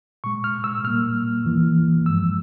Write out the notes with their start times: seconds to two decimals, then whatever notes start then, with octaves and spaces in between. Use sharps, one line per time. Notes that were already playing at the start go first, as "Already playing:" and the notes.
0.24 A#2 G#3 C#6
0.44 F6
0.64 E6
0.84 A#2 G3 A#3 F6
1.45 E2 E3 A#3
2.05 G2 F3 G#3 E6